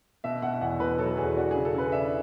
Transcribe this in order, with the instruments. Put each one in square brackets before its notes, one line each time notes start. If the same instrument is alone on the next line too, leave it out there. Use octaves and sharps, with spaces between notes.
[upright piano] B2 E5
B2 F#5
E2 F#5
B2 B4
F#3 A4
E2 G#4
D4 F#4
C#3 G#4
A4
C#3 B4
D4 E5